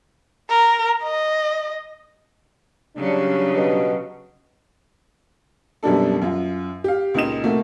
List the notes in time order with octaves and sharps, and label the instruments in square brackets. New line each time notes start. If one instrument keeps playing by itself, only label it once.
[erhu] A#4
D#5
[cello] C#3 F#3 [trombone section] G3 D4
[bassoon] B2
[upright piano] F#2 B2 G3 A#3 D4 A4
F#2 F4
G4 F5
C#2 A#2 C#3 D#4 D#5 E7
C3 A3 A#3 F#4